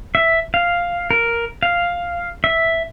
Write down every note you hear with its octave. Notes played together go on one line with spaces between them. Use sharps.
E5
F5
A#4
F5
E5